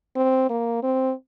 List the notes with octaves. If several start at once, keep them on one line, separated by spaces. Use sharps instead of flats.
C4
A#3
C4